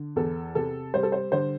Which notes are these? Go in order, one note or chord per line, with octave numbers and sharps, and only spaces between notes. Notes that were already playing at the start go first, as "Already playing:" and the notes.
Already playing: D3
E2 A4
C3 A4
G3 C5
A4
C5
D3 C5